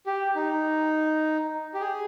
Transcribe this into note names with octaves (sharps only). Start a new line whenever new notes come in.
G4
D#4
G4
G#4